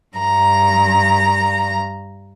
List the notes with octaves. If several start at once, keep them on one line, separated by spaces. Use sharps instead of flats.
G2 A#5